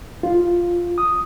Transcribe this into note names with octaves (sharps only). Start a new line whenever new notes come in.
F4
D#6